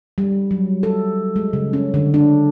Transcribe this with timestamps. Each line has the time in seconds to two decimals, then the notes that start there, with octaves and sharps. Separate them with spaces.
0.18 G3
0.51 F#3
0.83 A4
1.36 G#3
1.53 C#3
1.73 C#4
1.94 D3
2.14 D4